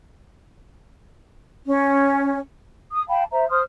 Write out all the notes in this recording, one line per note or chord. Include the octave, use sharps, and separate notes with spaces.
C#4
D#6
F5 G5 A5 B5
C5 E5 A#5
C5 C6 D#6 F6